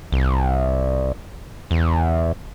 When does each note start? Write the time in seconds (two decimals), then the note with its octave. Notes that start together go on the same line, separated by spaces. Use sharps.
0.12 C2
1.71 E2